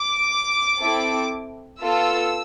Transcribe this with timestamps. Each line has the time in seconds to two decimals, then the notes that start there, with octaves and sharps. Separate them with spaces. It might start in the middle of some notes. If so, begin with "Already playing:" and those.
Already playing: D6
0.80 C4 E4 A4
1.82 B3 F4 A4 E6